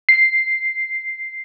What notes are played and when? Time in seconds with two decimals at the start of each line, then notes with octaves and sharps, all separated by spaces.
0.09 C7